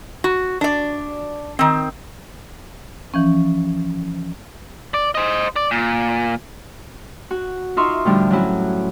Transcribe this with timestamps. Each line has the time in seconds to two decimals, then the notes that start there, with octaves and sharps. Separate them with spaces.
0.24 F#4
0.61 D4 D5
1.59 D#3 C4
3.14 E3 F3 C#4
4.94 D5
5.15 C5 D#5
5.56 D5
5.71 A#2
7.31 F#4
7.77 D#4 F4 E5 C6 C#6
8.05 A2 D3 F3 G3 D4
8.30 F#3 C#4 E4 F#4